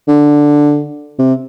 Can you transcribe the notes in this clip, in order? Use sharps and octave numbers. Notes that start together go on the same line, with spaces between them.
D3
C3